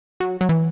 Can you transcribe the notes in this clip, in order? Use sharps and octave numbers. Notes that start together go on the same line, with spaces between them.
F#3
F#3
E3